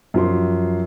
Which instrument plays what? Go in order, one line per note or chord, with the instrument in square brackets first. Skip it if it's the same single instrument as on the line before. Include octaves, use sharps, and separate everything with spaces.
[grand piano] F#2 F3 C6